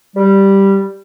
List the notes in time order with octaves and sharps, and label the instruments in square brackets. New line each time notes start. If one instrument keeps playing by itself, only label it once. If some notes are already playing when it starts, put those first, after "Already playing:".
[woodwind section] G3